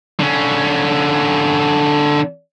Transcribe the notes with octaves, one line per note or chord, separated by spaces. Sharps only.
D3 C#4